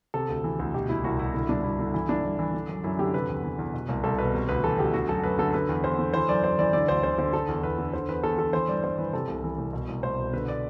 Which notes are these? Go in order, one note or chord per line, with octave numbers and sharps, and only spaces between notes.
C3 A4
D2
E3
D2
B2 G4
C2 E4
C2 F#4
B2 E4
D3 E4
G2 D4
G2 E4
D3
E3 E4
G2 D4
G2
E3
D3
F#2
F#2 E4
D3 G4
C3 B4
E2
E3
E2
B2
C2
C2 A4
B2 B4
C3
D2 B4
E3 A4
D2 G4
D3 F#4
F#2 A4
F#2 B4
D3 A4
D3 B4
E2
E2 C5
D3
E3 C5
F#2 D5
F#2 C5
E3 D5
D3 D5
D2 C5
D2 C5
D3 C5
D3 A4
E2
E2 B4
D3
D3 C5
E2 B4
E2 A4
D3 A4
E3 C5
G2 D5
G2 C5
E3 B4
C3 A4
C2
E3
C2
B2
C2
C2 C5
B2
D3 B4
D5